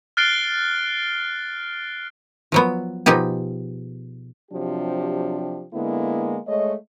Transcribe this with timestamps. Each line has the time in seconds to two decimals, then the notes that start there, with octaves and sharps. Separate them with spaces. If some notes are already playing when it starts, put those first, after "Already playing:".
0.17 F6 F#6 A6 C7 D7 G7
2.52 F3 F#3 B3
3.06 B2 F3 D#4 G4 G#4
4.51 C3 F3 F#3 D4 G4
5.73 D3 G#3 A#3 B3 E4
6.47 G#3 A3 C#5 D#5